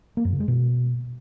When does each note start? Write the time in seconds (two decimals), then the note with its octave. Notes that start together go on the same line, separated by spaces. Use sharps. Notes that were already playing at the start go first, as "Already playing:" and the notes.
0.17 A#3
0.25 F#2
0.33 C#3
0.40 G#3
0.48 B2